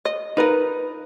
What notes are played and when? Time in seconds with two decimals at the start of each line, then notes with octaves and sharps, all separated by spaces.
0.05 D#5
0.37 F3 D#4 A#4 B4